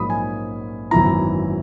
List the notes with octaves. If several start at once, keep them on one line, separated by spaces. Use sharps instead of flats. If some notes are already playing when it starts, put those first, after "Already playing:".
Already playing: A#1 G#2 F#3 A#3 B5 D#6
G#5
G#1 F#2 E3 B3 E4 A#5